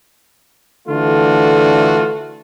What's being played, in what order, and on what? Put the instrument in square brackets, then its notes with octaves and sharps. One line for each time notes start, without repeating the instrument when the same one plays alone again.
[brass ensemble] D3 E3 A3 D4 F4 F#4